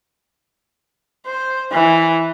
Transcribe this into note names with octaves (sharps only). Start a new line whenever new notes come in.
C5
E3